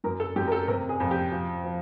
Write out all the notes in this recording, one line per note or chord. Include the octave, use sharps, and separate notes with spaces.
F#2 A#4
A4
F#2 G4
A#4
A4
C3 A#4
G#4
F2
G4
F3
F3